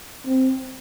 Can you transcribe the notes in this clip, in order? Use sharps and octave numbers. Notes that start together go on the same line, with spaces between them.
C4